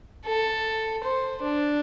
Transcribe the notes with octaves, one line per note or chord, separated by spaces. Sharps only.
A4
C5
D4